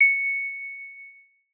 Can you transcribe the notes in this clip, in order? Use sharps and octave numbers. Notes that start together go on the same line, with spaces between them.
C#7